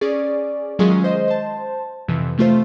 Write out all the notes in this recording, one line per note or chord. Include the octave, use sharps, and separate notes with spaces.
C#4 G#4 D5
D#3 F#3 G#3 C#4 F4 G#4
C5 D#5
C5 A5
F2 C3 E3
C3 A3 F4 C5